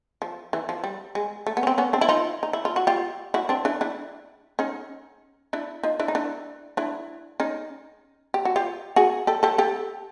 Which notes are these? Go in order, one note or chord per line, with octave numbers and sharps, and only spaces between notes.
F3
E3
F3
G3
G#3
A3
B3
C#4
C4
B3 C#4
C4 D4
E4
D#4 F4
D#4
E4
F4
F#4
F4 G4
E4 F#4
C4 D4
D4 E4
D4 E4
C#4 D#4
D4 E4
D#4 F4
D4 E4
D#4
D4 E4
D4 E4
C#4 D#4
G4
F#4
F4 G4
F#4 G#4
G4 A4
G4 A4
G4 A4